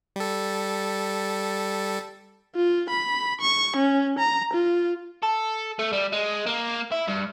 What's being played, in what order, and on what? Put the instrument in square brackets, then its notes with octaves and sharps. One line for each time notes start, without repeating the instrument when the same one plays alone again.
[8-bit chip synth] G3 A4
[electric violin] F4
B5
C#6
C#4
A#5
F4
[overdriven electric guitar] A4
A3
G3
G#3
A#3
E4
G2